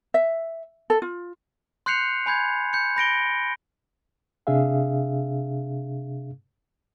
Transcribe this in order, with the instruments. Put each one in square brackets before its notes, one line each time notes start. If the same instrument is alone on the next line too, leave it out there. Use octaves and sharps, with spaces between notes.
[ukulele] E5
A4
F4
[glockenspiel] C6 F#6 G6 C7 C#7 F7
G#5 B5 G6 G#6
G6 C#7
B5 A#6 D7 G7
[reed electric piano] C3 D4 G#4 E5 F5